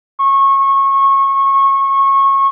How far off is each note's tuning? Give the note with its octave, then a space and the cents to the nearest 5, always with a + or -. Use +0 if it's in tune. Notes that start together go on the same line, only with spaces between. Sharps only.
C#6 -25